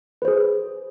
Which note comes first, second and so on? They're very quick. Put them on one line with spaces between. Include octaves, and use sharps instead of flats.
B4 C5 G#4